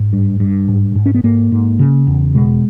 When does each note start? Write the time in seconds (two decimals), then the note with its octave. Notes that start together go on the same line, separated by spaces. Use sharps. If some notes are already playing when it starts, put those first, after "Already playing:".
Already playing: G#2
0.13 G2
0.40 G2
0.68 G#2
0.95 G#2
1.06 C#4
1.15 B3
1.23 G#2 A#3
1.52 G#2
1.79 C#3
2.07 E2
2.35 B2 G#3